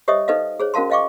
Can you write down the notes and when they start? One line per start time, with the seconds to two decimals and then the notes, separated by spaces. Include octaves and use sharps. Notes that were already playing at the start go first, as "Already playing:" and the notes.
0.08 G4 C5 C#5 D#5 E5 D#6
0.28 D#4 A4 B4 C5 D#5 F5
0.60 G#4 C5 C#5
0.74 C#4 F#4 A#4 F5 A5 C6
0.90 C5 D#5 F5 G5 C#6 D6